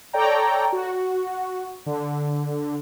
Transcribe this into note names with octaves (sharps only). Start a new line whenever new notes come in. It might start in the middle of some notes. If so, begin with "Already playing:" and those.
A4 C#5 D5 G5 A#5
F#4
D3